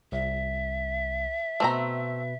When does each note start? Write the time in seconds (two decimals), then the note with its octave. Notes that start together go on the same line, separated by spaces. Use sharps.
0.12 C2 E5
1.60 B2 A3 C4 B4 A#5